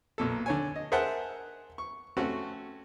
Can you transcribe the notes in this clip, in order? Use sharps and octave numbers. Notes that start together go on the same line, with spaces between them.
B1 A#2 A4
D3 C#5 G#5
D#5
G#4 A#4 C5 E5 F#5 A5
C#6
A3 C4 C#4 F#4